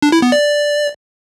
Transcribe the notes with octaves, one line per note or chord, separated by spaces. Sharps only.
D4
E4
B3
D5